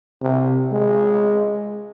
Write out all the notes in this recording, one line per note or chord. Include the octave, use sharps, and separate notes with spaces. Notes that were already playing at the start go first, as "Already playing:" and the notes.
C3
G#3